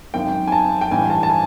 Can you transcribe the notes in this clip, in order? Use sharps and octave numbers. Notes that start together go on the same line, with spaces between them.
G#1 F#2 D#3 G5
G#5
A5
G5
A1 G2 E3 G#5
A5
A5
G#5